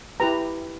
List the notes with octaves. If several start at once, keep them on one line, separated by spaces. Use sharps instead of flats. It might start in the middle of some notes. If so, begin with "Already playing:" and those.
E4 G4 B4 A#5